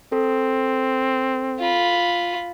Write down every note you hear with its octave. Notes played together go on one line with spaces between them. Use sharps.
C4 A4
F4 B5